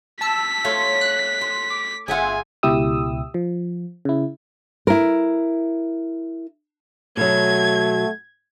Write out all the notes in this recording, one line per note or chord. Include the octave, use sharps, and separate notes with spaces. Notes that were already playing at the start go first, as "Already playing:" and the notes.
A5 E6 B6
A3 F4 C#5
F#6
C6
D6
G1 F4 G#4 E5 F#5 G#5
C#2 B2 E4 G4 D#6 E6
F3
C#3 E4
E4 A#4
B2 F#3 A3 G#6